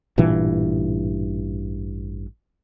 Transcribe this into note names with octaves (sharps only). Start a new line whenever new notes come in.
A1 G2 A#2 E3